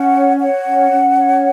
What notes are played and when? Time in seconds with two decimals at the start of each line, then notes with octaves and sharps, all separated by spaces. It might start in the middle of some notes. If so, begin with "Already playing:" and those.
Already playing: C#4 F#5
0.15 C#5
0.40 C#5 F#5
0.66 C#4
0.91 C#4
1.16 C#5